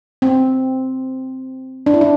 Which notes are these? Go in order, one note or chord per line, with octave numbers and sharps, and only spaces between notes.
C4
D4
E4
D4